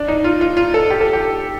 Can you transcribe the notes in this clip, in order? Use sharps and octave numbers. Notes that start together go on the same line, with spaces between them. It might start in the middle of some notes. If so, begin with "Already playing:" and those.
Already playing: D4
D#4
F4
F4
F4
A4
G4
A4
G4